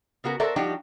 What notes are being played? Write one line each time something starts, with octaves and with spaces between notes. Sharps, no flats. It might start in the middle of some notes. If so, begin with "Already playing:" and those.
C#3 B3 F#4 A#4
F#4 A4 A#4 C5 D5 E5
F3 G3 D4 D#4 F#4 G4